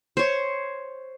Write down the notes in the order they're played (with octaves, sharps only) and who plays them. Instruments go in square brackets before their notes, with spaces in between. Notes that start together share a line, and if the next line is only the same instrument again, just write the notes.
[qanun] C5 C#5